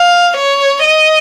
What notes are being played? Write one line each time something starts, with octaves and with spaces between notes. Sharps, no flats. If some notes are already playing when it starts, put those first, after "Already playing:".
Already playing: F5
C#5
D#5